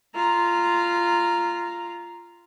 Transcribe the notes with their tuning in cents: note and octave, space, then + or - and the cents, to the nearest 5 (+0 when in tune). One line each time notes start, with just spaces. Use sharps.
F4 -10 A#5 +0